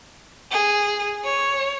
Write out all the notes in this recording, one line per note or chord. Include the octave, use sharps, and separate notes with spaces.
G#4
C#5